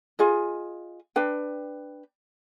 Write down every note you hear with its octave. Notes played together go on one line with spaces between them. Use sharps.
F4 G#4 D#5
D4 B4 G5